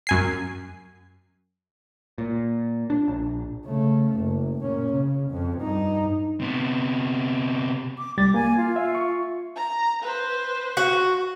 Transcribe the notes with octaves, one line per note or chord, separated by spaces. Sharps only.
F#2 G#5 C7
A#2
D4
A#1
C#3 A3
F#1
A#2 C#4
C#3
F2
G2 D#4
C3 B3
D6
C2 G3 D6 A6
A#3 G#5
F4
E5
C#6
A#5
B4 C5
F#4